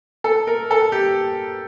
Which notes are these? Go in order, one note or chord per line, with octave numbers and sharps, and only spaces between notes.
A4
A#4
A4
G4